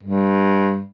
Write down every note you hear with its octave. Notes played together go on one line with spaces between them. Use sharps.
G2